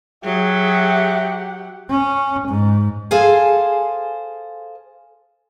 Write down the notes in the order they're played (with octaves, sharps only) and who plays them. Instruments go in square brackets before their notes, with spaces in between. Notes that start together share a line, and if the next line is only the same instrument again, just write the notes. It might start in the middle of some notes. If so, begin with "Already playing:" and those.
[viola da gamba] F#3 [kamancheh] G4 F#5 [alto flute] G#4 [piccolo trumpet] E5
[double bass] C#4
G#2
[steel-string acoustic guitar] G#4 A4 C5 F5 G#5